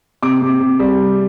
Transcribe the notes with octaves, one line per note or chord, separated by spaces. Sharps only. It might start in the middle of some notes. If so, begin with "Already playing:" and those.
C3 D6
C3
C3
G3